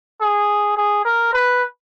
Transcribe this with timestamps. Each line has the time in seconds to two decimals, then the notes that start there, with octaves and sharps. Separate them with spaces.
0.21 G#4
0.77 G#4
1.05 A#4
1.33 B4